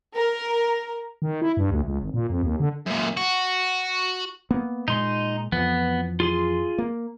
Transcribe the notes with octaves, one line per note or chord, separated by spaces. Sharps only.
A#4
D#3
E4
G2
D2
C#2
G#1
A#2
F2
D#2
D3
F#2 A#2
F#4
A#3 B3
A#2 G#3 D#4 C6
F2 E3 F3 B3
F4 G#4 C6
A#3